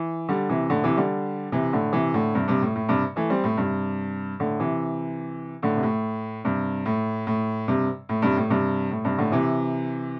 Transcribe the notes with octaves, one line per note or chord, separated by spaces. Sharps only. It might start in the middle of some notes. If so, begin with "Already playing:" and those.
Already playing: E3
D3 G3
C3 E3
A2 D3
C3 E3
D3 G3
C3 E3
A2 D3
C3 E3
A2 D3
G2 C3
G2 C3
A2
A2
G2 C3
E3 A3
G3 C4
A2
G2 C3
A2 D3
C3 E3
A2 D3
C3
A2
G2 C3
A2
A2
G2 C3
A2
G2 C3
A2
G2 C3
A2
G2 C3
A2 D3
C3 E3